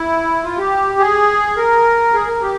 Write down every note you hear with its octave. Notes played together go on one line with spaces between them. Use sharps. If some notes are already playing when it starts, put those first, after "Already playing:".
Already playing: E4
F4
G4
G#4
A#4
G#4
A#4
G4